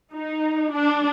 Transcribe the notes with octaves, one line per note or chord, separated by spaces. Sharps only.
D#4
D4